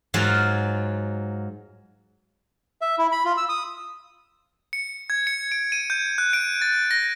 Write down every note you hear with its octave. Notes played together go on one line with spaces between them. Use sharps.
G#2 F#3 F4 F5
E5
E4
B5
F4
E6
D#6
C#7
G#6
C#7
D7
D#7
G6
F#6
D7
A6
A#6